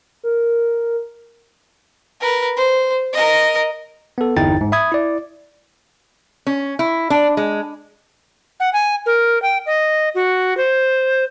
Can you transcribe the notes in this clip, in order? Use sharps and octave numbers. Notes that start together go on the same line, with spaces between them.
A#4
A#4 B4
C5
A#4 D#5
B3 A4
G1 E2 D#4 E4 G5 A6
G#2
E5 B5 D#6 G#6
E4 D5
C#4
E4
D4
G#3
F#5
G#5
A#4
G5
D#5
F#4
C5